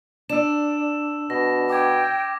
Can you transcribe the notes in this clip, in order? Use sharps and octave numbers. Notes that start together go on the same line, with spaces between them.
D4 E6 E7
B2 A#6
G5 D6 G#6